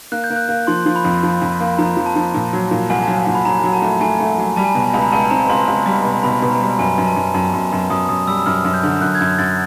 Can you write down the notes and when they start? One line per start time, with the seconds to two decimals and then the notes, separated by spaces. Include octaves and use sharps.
0.12 A#3 F#6
0.24 G6
0.30 A#3
0.36 F#6
0.49 A#3
0.67 F3 C6
0.86 F3
0.96 B5
1.04 F2
1.23 F3
1.42 F2
1.60 A#3
1.79 F3 A#5
1.97 F3
2.06 A5
2.16 F3
2.34 A#2
2.53 F#3
2.71 A#2
2.90 C2 G#5
3.03 F#3 A5
3.17 G#5
3.27 A#2
3.35 B5
3.45 F#3 A#5
3.64 F#3
3.73 A5
3.82 A3
4.01 A3 G#5
4.20 A3
4.38 F#3
4.56 G3 A5
4.64 G#5
4.72 A5
4.75 B2
4.84 G#5
4.94 C#2 B5
5.03 A#5
5.12 C#2 A5
5.30 C4 A#5
5.50 C#2 C6
5.68 C#2
5.86 G3
6.05 B2
6.23 B2 B5
6.42 B2
6.51 A#5
6.61 G3
6.79 F#2 G#5
6.98 F#2
7.07 A5
7.16 F#2
7.34 F#2 A5
7.53 F#2
7.72 F#2
7.90 F#2 D#6
8.09 F#2 D#6
8.27 G3 E6
8.39 E6
8.46 F#2 F6
8.65 F#2
8.74 G6
8.83 D3
9.01 F#2 F#6
9.15 G#6
9.20 F#2 G6
9.38 F#2 A6